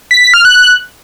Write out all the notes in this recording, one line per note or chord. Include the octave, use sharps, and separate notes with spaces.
B6
B6
F6
F#6